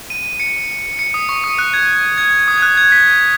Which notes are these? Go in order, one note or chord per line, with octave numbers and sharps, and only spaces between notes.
D#7
C#7
C#7
D#6
C#6
D#6
F#6
G#6
G#6
D#6
G#6
F#6
G#6
B6